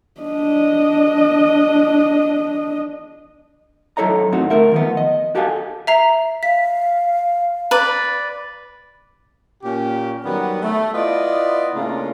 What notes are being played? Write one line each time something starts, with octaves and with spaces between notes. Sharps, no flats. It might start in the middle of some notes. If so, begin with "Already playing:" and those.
D4 D#5
F#2 E4 A4 C#5 D#5 A#5
A2 C4 D#4 F#4
D2 A3 A#4 E5
D#3 F3 B3
D#5
F#4 G4 A4 F5 F#5 G#5
E5 A#5 C7
F5 B6
B4 D5
A#2 C#4 G4
D#3 F#3 G3 B3
A3
B3 E4 F4 D5 D#5
A2 C#3 A#3 C#4 D4 F4